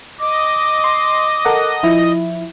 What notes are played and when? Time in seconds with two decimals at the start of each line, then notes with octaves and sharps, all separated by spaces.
0.20 D#5 D6
0.84 C6
1.45 A4 A#4 F#5
1.83 F3 E4